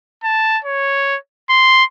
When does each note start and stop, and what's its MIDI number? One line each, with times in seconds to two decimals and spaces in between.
0.24 0.59 81
0.65 1.17 73
1.50 1.84 84